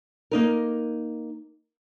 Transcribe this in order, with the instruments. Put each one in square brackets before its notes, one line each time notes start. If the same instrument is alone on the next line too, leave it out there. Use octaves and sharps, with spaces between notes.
[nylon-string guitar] A#3 D#4 A#4